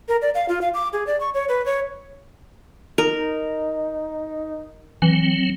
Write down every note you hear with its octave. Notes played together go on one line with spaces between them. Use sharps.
A#4
D5
F5
F4
F5
D6
G#4
D5
C#6
C#5
B4
C#5
D#4 A#4
E3 F#3 C4